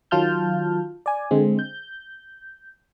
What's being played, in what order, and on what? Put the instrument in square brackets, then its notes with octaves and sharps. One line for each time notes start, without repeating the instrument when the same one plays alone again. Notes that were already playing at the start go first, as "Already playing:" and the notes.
[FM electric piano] D#3 F#3 F4 A5 F6 G6
D5 G#5
D3 G#3 C4
G6